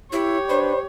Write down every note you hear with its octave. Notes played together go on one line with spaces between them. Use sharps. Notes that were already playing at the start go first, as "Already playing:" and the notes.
E4 G4 C#5
D4 B4 C5